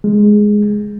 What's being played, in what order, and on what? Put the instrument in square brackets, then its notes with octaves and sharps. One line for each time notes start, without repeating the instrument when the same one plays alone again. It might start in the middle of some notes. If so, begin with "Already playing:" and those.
[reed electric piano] G#3